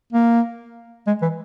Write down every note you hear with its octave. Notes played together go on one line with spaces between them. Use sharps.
A#3
G#3
E3